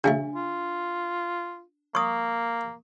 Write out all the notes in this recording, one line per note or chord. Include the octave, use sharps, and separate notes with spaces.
C#3 F#3 A3 D4 G#5
F4
A#3 C#6 D#6